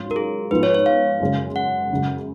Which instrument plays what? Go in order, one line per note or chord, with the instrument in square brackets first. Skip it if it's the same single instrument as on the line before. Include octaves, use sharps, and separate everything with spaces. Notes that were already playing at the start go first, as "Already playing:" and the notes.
Already playing: [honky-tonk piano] G#2 F#3 C#4 F4
[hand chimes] A#4
G#4
[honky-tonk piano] G#2 F3 G#3 B3 F4 [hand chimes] B4
[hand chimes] C#5
C#5
F5
[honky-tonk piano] F#2 C#3 G#3 C#4
[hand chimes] F#5
[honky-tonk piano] F#2 C#3 G#3